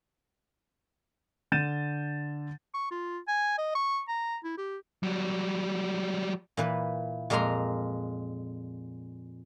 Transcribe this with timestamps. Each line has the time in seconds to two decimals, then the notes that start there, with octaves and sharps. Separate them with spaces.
1.52 D3 G6 A6 D#7 E7
2.74 C#6
2.91 F4
3.28 G#5
3.58 D#5
3.75 C#6
4.08 A#5
4.44 E4
4.58 G4
5.03 F#3 G3
6.57 A#2 E3 B4
7.30 F2 A#2 G#3 A#4 A#5 C6